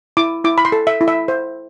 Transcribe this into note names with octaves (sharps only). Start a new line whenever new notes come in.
E4 D6
E4 D6
B5
C6
A4
E5
E4
E5
C5